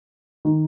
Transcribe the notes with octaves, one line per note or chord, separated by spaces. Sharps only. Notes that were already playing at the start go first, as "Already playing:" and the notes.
D#3